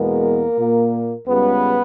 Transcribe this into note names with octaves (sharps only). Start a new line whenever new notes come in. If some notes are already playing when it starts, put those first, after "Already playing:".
Already playing: E2 B2 G#3 A#3 B3 A#4
A#2 A#3
C#2 C#3 G3 B3 B4